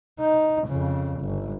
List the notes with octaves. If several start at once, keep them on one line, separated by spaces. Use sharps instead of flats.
D#4
F2 C#3
G1